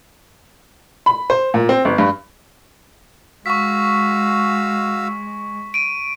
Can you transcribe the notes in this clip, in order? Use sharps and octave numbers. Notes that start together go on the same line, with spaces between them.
B5
C5
A#2
C4
G1
G2
G#3 F#4 F5 C#6 E6 B6
D7 D#7